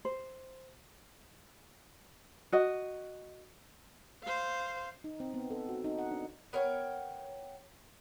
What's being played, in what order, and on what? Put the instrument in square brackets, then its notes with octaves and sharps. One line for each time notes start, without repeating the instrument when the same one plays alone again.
[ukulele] C5
F#4 D#5
[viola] C5 F5
[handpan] D#4
C4
B3
A4
F#4
D#4
F#5
D4
[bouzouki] B3 A#4 C#5 G5